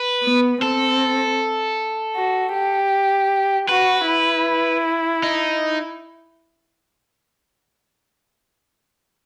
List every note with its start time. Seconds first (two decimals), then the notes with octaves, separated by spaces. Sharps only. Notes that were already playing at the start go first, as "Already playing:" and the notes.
Already playing: B4
0.23 B3
0.62 C4 A4
2.16 F#4
2.54 G4
3.69 F#4 B4
4.08 E4
5.23 D#4